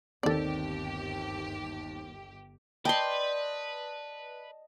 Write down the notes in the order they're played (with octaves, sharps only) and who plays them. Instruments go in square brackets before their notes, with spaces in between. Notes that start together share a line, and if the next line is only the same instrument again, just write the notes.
[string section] G1 G4 [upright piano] D#2 C4 [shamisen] A4 D5
[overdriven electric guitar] B4 [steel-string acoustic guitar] D5 [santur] D#5 A5 [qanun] G5 C6